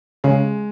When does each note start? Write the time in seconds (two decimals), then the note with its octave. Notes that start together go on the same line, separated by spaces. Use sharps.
0.24 C#3 G#3